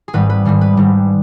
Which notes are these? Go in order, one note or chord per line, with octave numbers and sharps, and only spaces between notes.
G#4
G#1 G#2 G3 B4
B4
G#1 G#2 G3 G#4
B4
G#1 G#2 G3